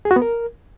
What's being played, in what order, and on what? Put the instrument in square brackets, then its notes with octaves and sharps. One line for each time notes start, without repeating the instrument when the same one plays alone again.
[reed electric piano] G#4
F#4
B3
A#4